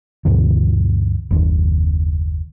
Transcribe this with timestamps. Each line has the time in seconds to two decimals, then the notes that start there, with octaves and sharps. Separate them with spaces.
0.25 D2 G2 B2 E3
1.31 F#1 D#2